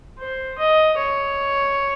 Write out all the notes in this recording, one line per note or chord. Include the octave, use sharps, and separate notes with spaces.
C5
D#5
C#5